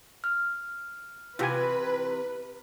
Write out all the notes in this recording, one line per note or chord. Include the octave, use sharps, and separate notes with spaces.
F6
C3 E3 F4 G4 B4 G#5